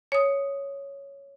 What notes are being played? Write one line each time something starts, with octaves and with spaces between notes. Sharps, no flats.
C#5 D#6